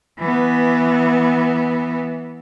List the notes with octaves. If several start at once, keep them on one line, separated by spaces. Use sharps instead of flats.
E3 B3